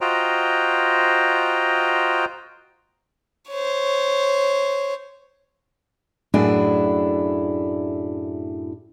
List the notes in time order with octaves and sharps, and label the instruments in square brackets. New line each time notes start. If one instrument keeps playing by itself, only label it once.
[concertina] F4 F#4 C5 D#5 G5 A#5
[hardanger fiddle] C5 C#5
[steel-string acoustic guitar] F#2 A2 D4 E4 F#4 G#4